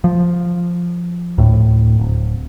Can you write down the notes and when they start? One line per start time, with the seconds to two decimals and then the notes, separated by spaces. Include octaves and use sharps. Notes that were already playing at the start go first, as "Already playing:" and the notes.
0.04 F3
1.38 D2 A2
1.99 D1